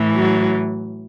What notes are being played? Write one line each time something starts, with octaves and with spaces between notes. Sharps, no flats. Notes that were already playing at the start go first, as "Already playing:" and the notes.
Already playing: A2 E3
F#3